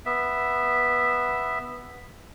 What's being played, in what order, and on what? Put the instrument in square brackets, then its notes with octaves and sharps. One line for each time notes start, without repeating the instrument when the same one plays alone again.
[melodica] B3 E5